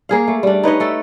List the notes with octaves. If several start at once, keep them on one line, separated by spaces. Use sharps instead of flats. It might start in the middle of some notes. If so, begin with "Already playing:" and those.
A#3 G#4 F5
A3
G3 D4
D#4 B4 C#5 D#5
A3 A4